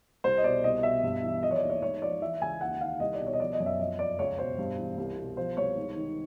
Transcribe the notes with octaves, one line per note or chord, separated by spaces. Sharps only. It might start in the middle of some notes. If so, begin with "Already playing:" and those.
C2 C5
D#5
B2 D5
C2 D#5
B2 E5
G2
E3
F3 D#5
C#5
D5
D#2
C#5
G#2 C#5
F3 D5
E3 E5
C#2 G#5
D#2 F#5
D#3 F5
C2 D#5
D5
B2
C#5
D#5
F3 D5
D#5
F#2
E5
F3 D#5
F2 D5
C#2 C#5
B2 C5
G2
E3
C2
B2
F3 C5
C2 C#5
G#2
D#3